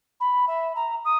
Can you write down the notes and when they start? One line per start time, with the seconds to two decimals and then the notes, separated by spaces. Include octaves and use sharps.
0.20 B5
0.47 E5
0.75 A#5
1.05 D#6